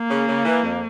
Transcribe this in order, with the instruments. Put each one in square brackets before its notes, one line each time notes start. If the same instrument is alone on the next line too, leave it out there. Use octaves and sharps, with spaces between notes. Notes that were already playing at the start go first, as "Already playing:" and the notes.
Already playing: [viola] A#3
[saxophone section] C#3
C#3
E3
F2